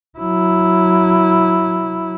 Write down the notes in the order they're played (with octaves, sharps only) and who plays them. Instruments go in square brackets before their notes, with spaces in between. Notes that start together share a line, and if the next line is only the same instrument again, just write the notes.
[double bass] F#3 E4